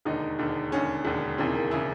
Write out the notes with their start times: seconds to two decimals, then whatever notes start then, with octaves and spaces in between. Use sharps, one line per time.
0.05 E1 D#2 D3 D#4
0.39 E1 D#2 D3
0.72 E1 D#2 D3 C#4
1.05 E1 D#2 D3
1.38 E1 D#2 C#3 E3 C4
1.55 A#3
1.71 C#3 E3 E4